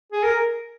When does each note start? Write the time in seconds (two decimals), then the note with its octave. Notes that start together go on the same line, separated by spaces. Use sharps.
0.13 G#4
0.24 A#4